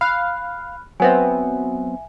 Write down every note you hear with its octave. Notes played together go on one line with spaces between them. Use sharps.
F5 B5 F6 F#6
F#3 B3 C4 E5 G#5